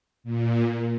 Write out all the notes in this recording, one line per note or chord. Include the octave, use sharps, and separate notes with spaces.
A#2